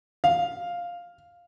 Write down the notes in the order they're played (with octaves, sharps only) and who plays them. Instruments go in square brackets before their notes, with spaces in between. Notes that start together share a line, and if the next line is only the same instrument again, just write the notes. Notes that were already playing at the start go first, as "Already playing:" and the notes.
[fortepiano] F5